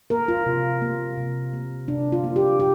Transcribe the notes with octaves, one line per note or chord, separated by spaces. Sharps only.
A#3 A#4
F4
C3
A#3
C3
A#3
C3 D4
F4
A#3
G4
G4